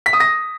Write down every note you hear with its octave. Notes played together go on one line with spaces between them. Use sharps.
B6
D#6
A#6